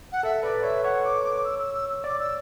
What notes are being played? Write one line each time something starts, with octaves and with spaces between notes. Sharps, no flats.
F#5
A4 E5
B4 D5
C#5 E5
C#5 F#5
D6
D6
D6
E6
E6
E6
E6
D5 D6
E6